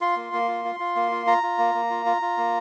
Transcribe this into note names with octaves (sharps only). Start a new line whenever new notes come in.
F4 C6
A#3
A#3
F4
F4
F4
A#3
F4
F4 A#5
F4
A#3
A#3
F4
F4
F4
A#3